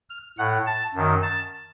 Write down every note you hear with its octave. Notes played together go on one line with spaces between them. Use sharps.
F6
A2 F#5
A5
F#2 D#3
A5